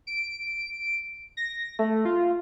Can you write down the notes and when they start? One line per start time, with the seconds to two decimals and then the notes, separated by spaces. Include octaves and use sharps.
0.07 D7
1.37 A#6
1.79 A3
2.05 F4